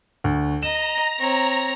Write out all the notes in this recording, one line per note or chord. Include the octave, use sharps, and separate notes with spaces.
D2
D#5 A#5 E7
C4 C#5